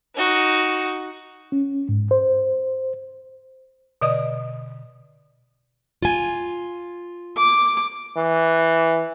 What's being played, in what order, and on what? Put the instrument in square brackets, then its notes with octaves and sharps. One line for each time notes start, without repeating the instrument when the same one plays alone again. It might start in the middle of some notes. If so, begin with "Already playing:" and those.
[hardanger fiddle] D#4 F#4
[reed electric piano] C#4
G#2
C5
[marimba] B2 D3 D5 D#5 D#6
[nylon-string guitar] F4 G#5
[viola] D6
[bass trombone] E3